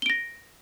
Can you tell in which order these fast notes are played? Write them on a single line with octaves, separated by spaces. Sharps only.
G7 D7 A#6